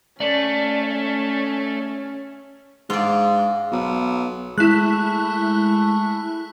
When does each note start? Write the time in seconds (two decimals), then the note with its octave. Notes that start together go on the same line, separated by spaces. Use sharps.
0.20 A3 C#4 D5
2.90 G#2 F4 D5
3.72 B1
4.58 G#3 A3 E4 F#6